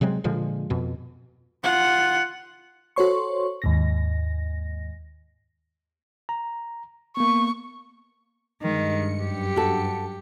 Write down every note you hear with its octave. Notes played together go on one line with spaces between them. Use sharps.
C3 F#3 G#3 C4
A#2 D3 F3 G#3
F2 B2
F4 F#5
F#4 A4 C5 C#5 C6 C#6
D#2 G#2 A#6
A#5
A#3 B3 C#6
G2 D#3 G#3 C#7
F#2 G4
F#4 A4